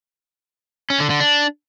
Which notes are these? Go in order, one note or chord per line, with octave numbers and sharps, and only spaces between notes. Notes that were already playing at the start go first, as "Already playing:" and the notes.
C#4
D3
D3
D4